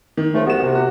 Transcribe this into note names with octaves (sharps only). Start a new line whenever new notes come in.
D#3
C#2 F3 A3
C2 B3 F#4 E7
C3
F#4